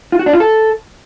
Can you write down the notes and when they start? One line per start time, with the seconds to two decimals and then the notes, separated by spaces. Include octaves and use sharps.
0.12 F4
0.19 F#4
0.26 D4
0.33 F4
0.40 A4